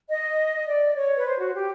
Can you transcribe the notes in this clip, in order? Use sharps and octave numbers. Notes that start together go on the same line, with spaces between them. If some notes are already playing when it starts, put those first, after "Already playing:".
D#5
D5
C#5
B4
C5
F#4
G4